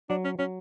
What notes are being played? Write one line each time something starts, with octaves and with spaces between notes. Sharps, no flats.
F#3 D4
C#4
F#3 C#4